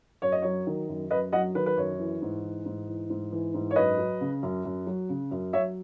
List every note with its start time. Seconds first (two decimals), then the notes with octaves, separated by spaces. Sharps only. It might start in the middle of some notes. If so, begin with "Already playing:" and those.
0.22 F#2 C#5
0.32 D#5
0.42 F#3 C#5
0.67 D#3
0.88 F#2
1.10 F#2 B4 D#5
1.32 F#3 D#5 F#5
1.55 D#3 B4
1.66 B4
1.77 F#2 C#5
1.99 E3
2.22 G#2
2.43 E3
2.65 G#2
2.88 E3
3.10 G#2
3.32 E3
3.54 G#2
3.71 C#5
3.76 F#2 B4 D#5
3.99 F#3
4.21 C#3
4.43 F#2
4.65 F#2
4.87 F#3
5.09 C#3
5.31 F#2
5.53 F#3 C#5 E5